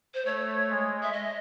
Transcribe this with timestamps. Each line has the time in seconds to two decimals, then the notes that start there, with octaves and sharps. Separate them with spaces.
0.14 C5
0.26 A3 C#5
0.70 G#3
1.03 E5
1.13 D#5